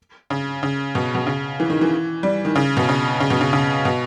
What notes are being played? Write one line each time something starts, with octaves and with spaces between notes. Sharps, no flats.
C#3
C#3
B2
B2
C#3
E3
D#3
E3
G3
D#3
C#3
B2
C#3
C#3
B2
C#3
C#3
B2